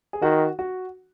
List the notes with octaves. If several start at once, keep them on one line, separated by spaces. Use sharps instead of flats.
G#4
D#3 F#4
F#4